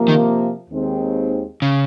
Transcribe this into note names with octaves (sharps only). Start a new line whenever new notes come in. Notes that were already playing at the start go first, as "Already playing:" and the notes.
Already playing: C3 F3 A#3
D#3
D#2 D#3 G#3 C4
C#3